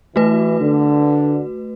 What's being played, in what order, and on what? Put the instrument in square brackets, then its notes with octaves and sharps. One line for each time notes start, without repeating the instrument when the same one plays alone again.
[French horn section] E3 [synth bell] A3 F#4 B4
[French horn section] D3